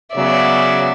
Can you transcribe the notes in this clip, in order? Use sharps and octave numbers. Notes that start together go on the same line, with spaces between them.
C#3 F#3 B3 D5 E5